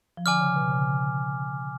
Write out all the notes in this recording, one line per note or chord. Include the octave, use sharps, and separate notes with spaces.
F3
D3 G#5 D6 F6
C#3
B2
C#3